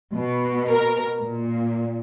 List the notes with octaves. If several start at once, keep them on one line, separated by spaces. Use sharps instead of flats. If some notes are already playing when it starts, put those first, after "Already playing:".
B2
A#4
A#2